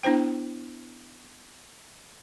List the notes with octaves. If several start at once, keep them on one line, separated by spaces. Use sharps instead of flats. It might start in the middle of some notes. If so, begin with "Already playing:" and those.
B3 D4 E4 C5 G5